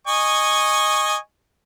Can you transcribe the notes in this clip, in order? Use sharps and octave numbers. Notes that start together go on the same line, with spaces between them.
D#5 G#5 C#6